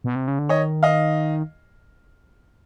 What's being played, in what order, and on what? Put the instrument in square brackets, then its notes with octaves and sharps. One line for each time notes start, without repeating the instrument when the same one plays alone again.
[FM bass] B2
C3
C#3
D3
[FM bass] D#3 [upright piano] C#5 D#5
[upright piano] D#5 F5